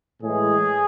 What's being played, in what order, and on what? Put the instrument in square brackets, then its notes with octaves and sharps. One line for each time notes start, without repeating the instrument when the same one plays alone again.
[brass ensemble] A2 E3 G#3 G#4